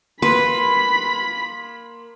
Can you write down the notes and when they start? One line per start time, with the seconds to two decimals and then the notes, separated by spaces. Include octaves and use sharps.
0.22 A#3 B4 B5 C6